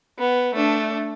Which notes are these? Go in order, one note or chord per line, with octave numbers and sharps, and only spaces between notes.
B3
A3 D4